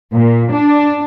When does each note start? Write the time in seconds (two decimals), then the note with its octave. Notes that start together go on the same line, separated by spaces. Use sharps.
0.13 A#2
0.52 D4